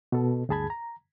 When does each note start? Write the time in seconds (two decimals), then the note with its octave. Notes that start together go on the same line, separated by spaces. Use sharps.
0.12 B2 A4
0.49 D2 G2 G#4 A5 B5 G#6
0.70 A#5